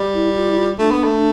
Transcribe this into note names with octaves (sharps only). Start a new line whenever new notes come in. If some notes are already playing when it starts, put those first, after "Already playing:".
Already playing: G3
E4
F4
E4
F4
A3 D4
B3
A3